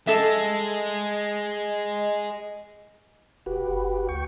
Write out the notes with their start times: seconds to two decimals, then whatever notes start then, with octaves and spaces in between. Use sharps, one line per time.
0.07 G#3 A4 E5
3.46 E1 F#4 G4 B4
3.68 F#1
4.09 D2 G5 C#6